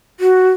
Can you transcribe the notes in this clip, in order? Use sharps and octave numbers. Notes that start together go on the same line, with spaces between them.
F#4